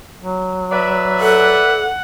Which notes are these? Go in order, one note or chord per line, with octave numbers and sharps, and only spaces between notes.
F#3
B4 D5 E5
A4 F#5